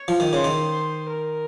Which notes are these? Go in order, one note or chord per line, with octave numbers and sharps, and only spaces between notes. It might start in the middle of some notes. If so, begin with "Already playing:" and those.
Already playing: C#5
F3
D#3
C#3 C5
D#3
C5
A#4